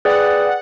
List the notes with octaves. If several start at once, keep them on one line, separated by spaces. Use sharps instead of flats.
G#4 B4 D5 F#5 G5